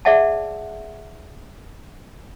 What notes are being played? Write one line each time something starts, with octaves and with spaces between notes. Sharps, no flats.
G#4 D5 E5 F#5 A5